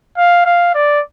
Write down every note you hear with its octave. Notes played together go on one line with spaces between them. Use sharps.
F5
F5
D5